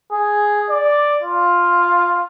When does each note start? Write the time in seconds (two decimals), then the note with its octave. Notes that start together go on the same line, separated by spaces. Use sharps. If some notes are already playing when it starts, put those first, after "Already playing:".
0.12 G#4
0.70 D5
1.22 F4